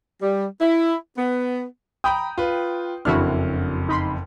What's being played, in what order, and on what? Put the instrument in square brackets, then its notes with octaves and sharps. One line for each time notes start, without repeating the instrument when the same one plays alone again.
[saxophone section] G3
E4
B3
[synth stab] G5 [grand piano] A#5 B5 D#6
[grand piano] F4 B4
[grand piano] F#1 F2 F6 [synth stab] D4 E4 F#4
[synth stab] D#4 B5 C6